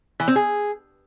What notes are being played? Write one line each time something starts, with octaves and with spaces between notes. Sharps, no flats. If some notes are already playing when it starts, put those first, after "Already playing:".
E3
C4
G#4